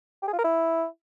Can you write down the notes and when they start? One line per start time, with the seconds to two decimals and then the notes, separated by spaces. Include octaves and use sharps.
0.22 G4
0.28 G#4
0.33 F4
0.39 A#4
0.44 E4